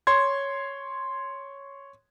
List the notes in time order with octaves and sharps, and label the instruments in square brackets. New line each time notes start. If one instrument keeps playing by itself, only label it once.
[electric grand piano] C#5 C6 G#6